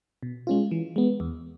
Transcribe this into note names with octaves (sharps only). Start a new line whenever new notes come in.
B2
G#3 C#4 F4
E3
G#3 B3
E2